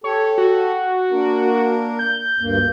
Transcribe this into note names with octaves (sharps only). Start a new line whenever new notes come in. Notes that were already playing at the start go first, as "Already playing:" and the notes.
G4 A4 C#5
F#4
A#3 D4 A#4
G6
D2 G2 A#3